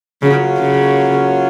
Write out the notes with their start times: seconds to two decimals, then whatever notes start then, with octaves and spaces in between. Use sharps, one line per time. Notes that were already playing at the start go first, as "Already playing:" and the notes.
0.22 C#3 F#3 A#3 C#4 F4
0.60 C#3